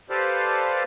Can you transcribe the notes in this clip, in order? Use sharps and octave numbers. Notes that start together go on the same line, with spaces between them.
G4 A4 B4 C5 D5 F5